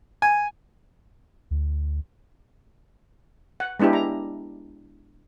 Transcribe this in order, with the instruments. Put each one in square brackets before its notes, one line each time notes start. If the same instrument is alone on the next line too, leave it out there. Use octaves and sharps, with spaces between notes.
[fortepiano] G#5
[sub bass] D2
[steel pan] F#5
G#3 B3 D4 E4 G4
A#5